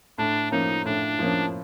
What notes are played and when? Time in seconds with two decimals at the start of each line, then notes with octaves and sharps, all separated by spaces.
0.18 A2 D4
0.51 F3 A#3 C#4 D#4
0.85 A2 D4
1.19 F3 A#3 C#4